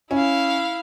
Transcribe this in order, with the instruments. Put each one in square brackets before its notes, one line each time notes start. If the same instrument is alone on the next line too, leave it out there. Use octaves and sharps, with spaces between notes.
[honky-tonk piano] C#4 [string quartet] E4 F5